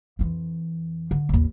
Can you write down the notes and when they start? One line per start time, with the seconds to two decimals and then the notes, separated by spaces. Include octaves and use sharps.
0.19 F2 E3
1.11 D3
1.29 A1 D#2